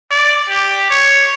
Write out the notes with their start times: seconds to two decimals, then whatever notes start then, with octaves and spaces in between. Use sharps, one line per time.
0.11 D5
0.49 G4
0.90 C#5